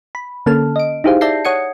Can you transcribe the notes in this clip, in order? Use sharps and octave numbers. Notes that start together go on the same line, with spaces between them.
B5
D3 A#3 C#4 A4 A5 F6
D#5 D7
D#4 E4 G4 G#4 C5 F5
D5 E5 A5 G6 A#6 C7
C#5 F#5 D#6 G#6 C#7